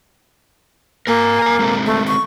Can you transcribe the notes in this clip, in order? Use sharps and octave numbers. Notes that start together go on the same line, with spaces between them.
A#3 A#4 G#5
A#4 G#5
G#3 C4 A4
A3
C#6